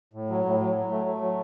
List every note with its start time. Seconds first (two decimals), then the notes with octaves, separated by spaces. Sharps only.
0.13 A2
0.30 F#3
0.45 A2
0.60 F#3
0.75 F#3
0.90 A3
1.06 A3
1.21 F#3